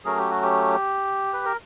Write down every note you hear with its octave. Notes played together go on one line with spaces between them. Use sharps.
F#3 A3 C#4 G#4 A#4
G4
F#4
G4
B4
A#4